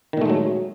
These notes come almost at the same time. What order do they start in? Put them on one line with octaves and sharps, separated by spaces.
D#3 A#2 A3 G#3 F#3